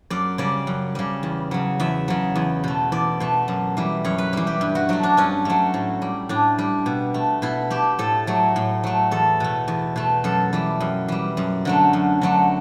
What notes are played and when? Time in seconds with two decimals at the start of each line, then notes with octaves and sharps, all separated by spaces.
0.10 F#2 D5
0.38 C#3 G3 D5
0.67 F#2
0.95 C#3 G3
1.23 E2
1.51 C#3 F#3
1.80 E2 E5
2.08 C#3 F#3
2.35 E2
2.64 B2 A3
2.92 E2 D5
3.20 B2 A3
3.48 F#2
3.77 E3 G3
4.05 F#2 C#5
4.18 B4
4.33 E3 G3
4.47 G4
4.61 G2
4.75 F#4
4.89 F#3 A3 F#4
5.03 D4
5.17 G2 C#4
5.45 F#3 A3
5.74 A2
6.02 G3
6.29 A2 D4
6.59 G3
6.86 B2
7.14 A3
7.42 B2 E4
7.70 A3 G4
7.99 A2 A4
8.27 F#3 A3
8.56 A2
8.83 F#3 A3
9.11 E2 A4
9.40 B2 A3
9.68 E2
9.96 B2 A3
10.24 F#2 A4
10.53 E3 G3
10.80 F#2
11.08 E3 G3
11.37 F#2
11.65 D3 F#3 A3
11.93 F#2
12.21 D3 F#3 A3